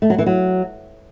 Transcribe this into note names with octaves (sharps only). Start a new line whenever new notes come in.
A3
F#3
E3
F#3